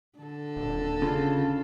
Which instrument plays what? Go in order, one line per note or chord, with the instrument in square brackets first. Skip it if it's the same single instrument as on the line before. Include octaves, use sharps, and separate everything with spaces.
[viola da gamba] D3 A4
[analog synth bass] D#1
[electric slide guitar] C#3 [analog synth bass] F4